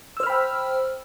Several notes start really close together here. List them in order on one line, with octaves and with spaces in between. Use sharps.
E6 C5 F6 B5 G5